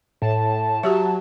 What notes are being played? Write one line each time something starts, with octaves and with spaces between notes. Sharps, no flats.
A2 A5
F#3 F#4 G4 E5